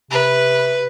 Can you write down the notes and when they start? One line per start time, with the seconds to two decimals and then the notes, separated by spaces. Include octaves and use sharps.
0.11 C3 B4